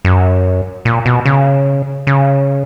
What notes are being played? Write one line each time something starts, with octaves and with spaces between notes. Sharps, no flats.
F#2
A#2
B2
C#3
C#3